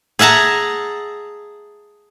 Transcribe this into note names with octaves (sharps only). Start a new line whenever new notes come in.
G#4 E5 F#5 A5 A#5